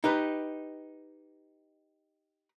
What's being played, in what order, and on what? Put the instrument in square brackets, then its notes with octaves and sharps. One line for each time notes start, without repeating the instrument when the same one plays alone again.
[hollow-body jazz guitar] D#4 G4 B4